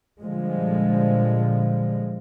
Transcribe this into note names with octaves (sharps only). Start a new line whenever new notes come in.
A#2 D3 F3 G3 G#3